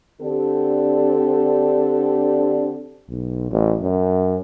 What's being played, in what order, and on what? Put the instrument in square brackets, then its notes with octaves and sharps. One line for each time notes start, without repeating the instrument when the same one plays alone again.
[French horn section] D3 C4 D4 G4 A4
[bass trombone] B1
A1
F#2